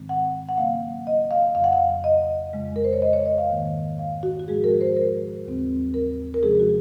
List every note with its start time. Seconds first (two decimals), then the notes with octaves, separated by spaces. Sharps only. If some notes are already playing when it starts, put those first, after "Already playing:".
Already playing: G#2 D#3 G#3 C4
0.09 F#5
0.49 F#5
0.58 C#3 F#3 A#3 C#4 F5
1.07 D#5
1.31 F5
1.55 F2 C#3 F#3 F5
1.64 F#5
1.73 F5
2.04 D#5
2.53 F2 C#3 G#3
2.76 A#4
2.84 C5
2.93 C#5
3.02 D#5
3.13 C#5
3.26 D#5
3.38 F5
3.50 G#2 D#3 A#3
3.99 F5
4.23 F#4
4.39 F#4
4.48 G#2 F3 G#3 G#4
4.64 A#4
4.81 C5
4.97 A#4
5.46 D#2 C#3 F#3 C4
5.94 A#4
6.34 A#4
6.42 C3 F3 G#3 C#4 G#4
6.60 F#4